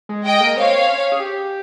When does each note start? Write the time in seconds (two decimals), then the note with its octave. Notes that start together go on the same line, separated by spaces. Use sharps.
0.09 G#3
0.25 G#3 D#5 G5
0.40 A#3
0.56 C4 C#5 F5
0.87 C#4
1.12 G#4
1.19 G4